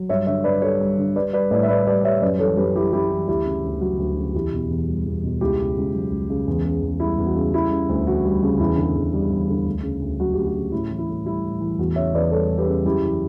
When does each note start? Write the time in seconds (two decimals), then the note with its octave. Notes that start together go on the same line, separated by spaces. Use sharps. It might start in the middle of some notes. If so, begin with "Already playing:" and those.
Already playing: F#3
0.09 G2 C#5 E5
0.26 D3 C#5 E5
0.44 G2 B4 D5
0.62 G3 A4 C#5
0.80 G2
0.98 D3
1.16 G3 B4 D5
1.33 G3 B4 D5
1.51 A2 B4 D5
1.63 E5
1.68 A2 B4 D5
1.86 G3 B4 D5
2.04 G3 C#5 E5
2.22 F#2 B4 D5
2.39 E3 A4 C#5
2.57 F#2 G4 B4
2.75 G3 E4 G4
2.93 F#2 E4 G4
3.11 E3
3.28 D2 E4 G4
3.45 C#3
3.64 D2
3.81 F#3 F#4
3.99 D2
4.17 C#3
4.34 E2 E4 G4
4.52 B2
4.69 E2
4.88 G3
5.06 E2
5.24 B2
5.41 C#2 E4 G4
5.59 C#3
5.77 C#2
5.95 F#3
6.11 C#2
6.30 C#3
6.48 E2
6.65 C#3
6.83 E2
7.00 G3 E4
7.18 E2
7.26 F#4
7.35 C#3
7.54 G3 E4
7.72 C#3
7.89 D2
8.06 E3 F#4
8.24 G3
8.43 C#3
8.59 E2 E4
8.77 D3
8.96 E2
9.13 G3
9.30 E2
9.49 D3
9.66 D2
9.83 C#3
10.02 D2
10.20 F#3 F#4
10.33 D2 G4
10.46 F#4
10.54 C#3
10.72 A2 E4
10.91 E3
10.98 E4
11.08 A2
11.25 G3 E4
11.44 A2
11.60 E3
11.79 E2 F#4
11.96 C#3 C#5 E5
12.14 E2 B4 D5
12.31 G3 A4 C#5
12.49 E2
12.58 G4 B4
12.67 C#3
12.84 F#2 E4 G4
13.03 E3